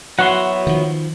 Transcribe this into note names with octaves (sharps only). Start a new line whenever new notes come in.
F#3 B3 E4 F#4 F#5 C6
D#3 F3